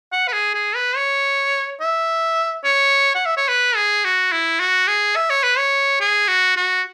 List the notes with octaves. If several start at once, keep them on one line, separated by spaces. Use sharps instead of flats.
F#5
B4
G#4
G#4
B4
C#5
E5
C#5
F#5
E5
C#5
B4
G#4
F#4
E4
F#4
G#4
E5
C#5
B4
C#5
G#4
F#4
F#4